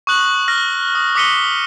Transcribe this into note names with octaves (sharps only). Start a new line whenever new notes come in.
C#6 D#6 F#6 F#7
F6 A#6
D#6
D6 D#6 B6 C#7 D#7 G7